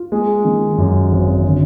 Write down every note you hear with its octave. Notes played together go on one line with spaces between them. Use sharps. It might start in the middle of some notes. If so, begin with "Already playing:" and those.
Already playing: F4
G#3
D#3
F#2
G#1
D3